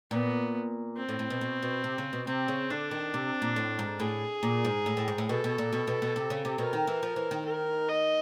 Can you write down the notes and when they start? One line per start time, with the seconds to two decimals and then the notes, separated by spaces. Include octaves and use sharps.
0.11 A#2 B3
0.97 C4
1.09 A2
1.19 A2
1.30 B2
1.41 B2
1.62 B2
1.84 C3
1.98 C#3
2.13 B2
2.27 C3 C4
2.48 C#3
2.70 D3 D4
2.91 D#3
3.14 C3
3.42 A#2
3.56 A2
3.79 G#2
4.00 A2 G#4
4.43 A#2
4.65 G#2
4.86 A2
4.97 A2
5.08 G#2
5.18 A2
5.29 B2 A4
5.44 B2
5.58 A#2
5.73 B2
5.87 B2
6.02 B2
6.16 C3
6.30 C#3
6.45 C3
6.58 B2 A#4
6.73 D#3
6.87 E3
7.03 F3
7.16 E3
7.31 D#3
7.46 A#4
7.88 D#5